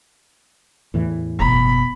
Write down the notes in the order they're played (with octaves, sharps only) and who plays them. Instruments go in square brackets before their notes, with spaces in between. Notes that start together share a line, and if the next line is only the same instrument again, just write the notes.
[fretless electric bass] E2 A2 E3
[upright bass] F#1 B2 [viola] B5